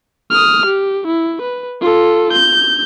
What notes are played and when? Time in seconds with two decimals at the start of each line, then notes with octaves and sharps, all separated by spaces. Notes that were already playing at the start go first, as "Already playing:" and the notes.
0.31 D#6 F6
0.66 G4
1.07 E4
1.42 B4
1.81 F4 A4
2.32 G6